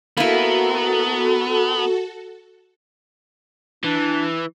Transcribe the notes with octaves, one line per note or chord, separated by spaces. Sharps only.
A#3 B3 E4 F#4 A4
E3 D4